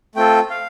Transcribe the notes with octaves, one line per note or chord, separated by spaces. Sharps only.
A3 C4 F4 A4 G5
F5